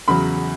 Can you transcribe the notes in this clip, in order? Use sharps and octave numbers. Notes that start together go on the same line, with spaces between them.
E2 C#3 F#3 B5